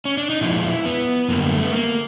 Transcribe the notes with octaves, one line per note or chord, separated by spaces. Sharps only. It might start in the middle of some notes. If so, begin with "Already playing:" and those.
C#4
D4
D#4
A#2 F3 G#3 E4
B3
F#2 D3 G3 A#3
A3
B3
A#3